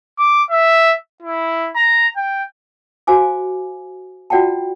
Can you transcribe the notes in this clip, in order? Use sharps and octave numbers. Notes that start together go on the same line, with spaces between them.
D6
E5
E4
A#5
G5
F#4 C5 F5 G#5 D6
F4 F#4 D5 F#5 G5 A5